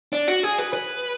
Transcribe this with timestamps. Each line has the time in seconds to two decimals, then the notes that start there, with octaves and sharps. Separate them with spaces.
0.13 D4
0.28 F#4
0.43 G#4
0.58 B4
0.73 B4